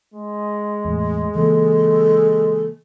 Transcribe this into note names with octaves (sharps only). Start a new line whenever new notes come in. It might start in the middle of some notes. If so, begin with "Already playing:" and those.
G#3
E2 A2
C#3 E3 A#3 A4